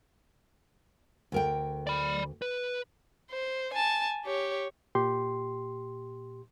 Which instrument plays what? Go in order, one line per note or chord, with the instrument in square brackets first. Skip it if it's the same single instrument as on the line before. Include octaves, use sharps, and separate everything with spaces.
[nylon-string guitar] D2 A#4 G5
[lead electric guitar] D5 B5
B4
[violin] C5
G#5 A5
G4 C#5
[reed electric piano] A#2 G4 C6